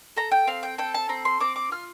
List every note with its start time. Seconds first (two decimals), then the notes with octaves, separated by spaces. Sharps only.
0.16 A4 A#5
0.31 G5
0.47 C4 F5
0.63 G5
0.78 A4 G5
0.94 A5
1.09 C4 A#5
1.25 C6
1.40 C4 D6
1.56 D6
1.71 F4 F6